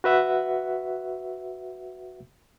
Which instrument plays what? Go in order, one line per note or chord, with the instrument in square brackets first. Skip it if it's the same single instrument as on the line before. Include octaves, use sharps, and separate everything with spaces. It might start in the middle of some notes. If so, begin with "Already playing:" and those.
[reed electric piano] F#4 B4 E5 F#5